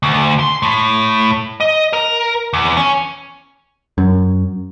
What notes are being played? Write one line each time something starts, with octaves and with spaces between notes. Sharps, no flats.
D2
C6
A2
D#5
A#4
E2
C#4
F#2